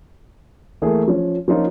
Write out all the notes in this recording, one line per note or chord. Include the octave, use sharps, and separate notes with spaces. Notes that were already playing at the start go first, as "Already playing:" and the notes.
E3 A3 A#3 G#4
F3 C#4
F3 A#3 C#4 D#4 F4